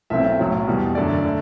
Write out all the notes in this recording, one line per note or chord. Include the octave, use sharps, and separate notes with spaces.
B1 B2 A3 C4 E4 E5
B1 A2 F#3
E2 B2 G3
F#2 D3 A3 D5
D3 A3